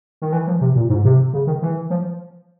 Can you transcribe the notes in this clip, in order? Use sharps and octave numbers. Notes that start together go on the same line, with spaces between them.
D#3
E3
F3
C3
A#2
G#2
C3
C#3
D#3
E3
F3